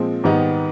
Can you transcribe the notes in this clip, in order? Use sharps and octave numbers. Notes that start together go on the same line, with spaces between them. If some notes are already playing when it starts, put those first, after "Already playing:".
Already playing: A#2 F3 G#3 C4
G#2 D#3 G3 B3 D#4